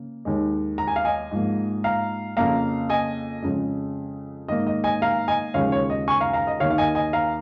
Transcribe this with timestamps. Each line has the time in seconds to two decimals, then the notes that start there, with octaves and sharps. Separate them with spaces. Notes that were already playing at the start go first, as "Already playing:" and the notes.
Already playing: C#3 A#3
0.25 D#2 D#3 G#3
0.78 A#5
0.87 G#5
0.96 F5
1.05 D#5 G#5
1.31 G#2 F3 A#3
1.84 F5 A#5
2.37 F2 C#3 A#3 F5 A#5
2.90 D#5 G#5
3.42 F2 C#3 G#3
4.48 G#2 D#3 A#3 D#5
4.67 D#5
4.84 D#5 G#5
5.02 F5 A#5
5.28 D#5 G#5
5.54 D#2 C#3 F3 G#3 C#5 F5
5.72 C#5
5.90 D#5
6.08 G#5 C#6
6.21 F5 A#5
6.33 F5 A#5
6.47 D#5
6.60 D#2 D#3 A#3 C#5 F5
6.70 F5
6.78 D#5 G#5
6.95 D#5 G#5
7.13 F5 A#5